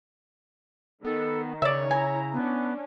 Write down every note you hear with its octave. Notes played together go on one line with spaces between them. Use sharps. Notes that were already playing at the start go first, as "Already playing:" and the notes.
D#3 B3 A4
C#3 C#5 D5 E5
E4 G#5 A#5
B3 C#4 D4